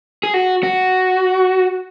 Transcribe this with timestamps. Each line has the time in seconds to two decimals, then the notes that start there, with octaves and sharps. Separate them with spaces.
0.23 G#4
0.34 F#4
0.63 F#4